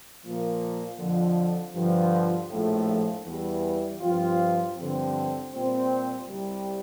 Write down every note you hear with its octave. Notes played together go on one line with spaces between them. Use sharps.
A#2 F3 A#3
F2 D3 F3
G2 D3 F3
A#1 A2 F3 A3
E2 E3 G3
G2 F3 C4 F4
G2 D3 F3 C4
A#2 G3 C4
C2 C3 G3